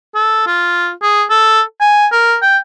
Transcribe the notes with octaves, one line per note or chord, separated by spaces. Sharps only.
A4
F4
G#4
A4
G#5
A#4
G5